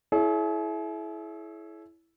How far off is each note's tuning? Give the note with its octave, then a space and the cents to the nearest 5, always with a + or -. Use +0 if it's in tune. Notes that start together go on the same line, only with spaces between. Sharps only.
E4 +0 G#4 +45 C#5 +30